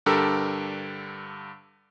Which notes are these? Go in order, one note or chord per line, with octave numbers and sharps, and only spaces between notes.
G2 D3 G4 A4 A#4 E6